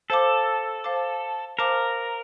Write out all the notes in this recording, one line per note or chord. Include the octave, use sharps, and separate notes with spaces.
A4 C5 F5 A5 D6
C5 F5 A5 D6
A#4 C5 F5 A5 D6